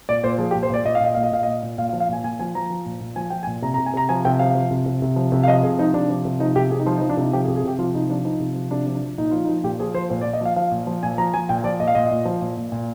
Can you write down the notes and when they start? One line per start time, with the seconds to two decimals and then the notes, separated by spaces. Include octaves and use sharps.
0.09 A#2 D5
0.23 A#2 C5
0.38 F3 G#4
0.51 G4
0.55 A#2
0.63 C5
0.70 A#2 D5
0.85 A#2 D#5
0.95 F5
1.00 A#2 D#5
1.15 A#2 F5
1.23 D#5
1.32 A#2 F5
1.43 A#2 D#5
1.63 A#2
1.78 A#2 F5
1.89 F5
1.93 F3
2.00 F5
2.08 A#2 G#5
2.23 A#2 G#5
2.39 F3 G#5
2.55 F3 A#5
2.70 F3
2.86 A#2
3.01 A#2
3.16 F3 G#5
3.30 F3 G5
3.43 G#5
3.47 A#2
3.62 C3 A#5
3.74 A#5
3.78 C3
3.86 G#5
3.94 C3 A#5
4.09 F3 G#5
4.25 C3 G5
4.39 F3 F5
4.55 F3
4.71 C3
4.86 C3
5.02 C3
5.16 F3
5.32 C3
5.43 F5
5.48 F3 D#5
5.63 C3 G#4
5.79 F3 D#4
5.94 C3 D4
6.10 F3
6.25 C3
6.40 F3 D#4
6.56 C3 G4
6.71 C3 G#4
6.80 D#4
6.86 F3 F4
6.98 D#4
7.02 F3
7.09 D4
7.17 C3 D#4
7.33 F3 G4
7.44 G#4
7.48 C3
7.56 G#4
7.64 C3 G4
7.79 F3 F4
7.94 C3 D#4
8.10 F3 D4
8.25 F3 D#4
8.40 C3
8.56 F3
8.71 C3 D4
8.87 F3
8.95 D4
9.02 F3
9.18 A#2 D#4
9.31 F3 F4
9.45 D#4
9.49 F3
9.64 A#2 G4
9.80 F3 G#4
9.94 F3 C5
10.10 A#2 C5
10.21 D5
10.26 A#2
10.33 D#5
10.41 F3 F5
10.56 F3 F5
10.71 A#2
10.87 F3
11.03 A#2 G#5
11.18 F3 A#5
11.34 F3 G#5
11.49 A#2 G5
11.64 F3 D5
11.80 A#2 D#5
11.88 F5
11.95 A#2 D#5
12.11 A#2
12.25 F3
12.41 A#2
12.57 A#2
12.72 A#2